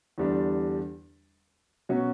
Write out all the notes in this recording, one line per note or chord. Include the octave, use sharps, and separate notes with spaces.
E2 D3 G3 D4
B2 F#3 C#4 F#4